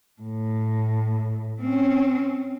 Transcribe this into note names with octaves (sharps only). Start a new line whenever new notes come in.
A2
C4 C#4